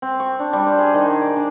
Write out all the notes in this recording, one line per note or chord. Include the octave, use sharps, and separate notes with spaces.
C4
C#6
D4
G3
C5
G#4
D#3
D5
D4